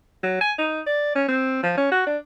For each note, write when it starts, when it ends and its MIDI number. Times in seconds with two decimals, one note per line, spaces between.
0.23 0.37 54
0.41 0.52 80
0.58 0.81 63
0.86 1.11 74
1.15 1.24 61
1.28 1.59 60
1.63 1.73 53
1.77 1.88 61
1.92 2.03 66
2.07 2.17 62